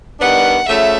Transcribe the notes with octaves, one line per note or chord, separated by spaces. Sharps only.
D#3 G3 B3 D4 F#5
C#3 F3 A3 E5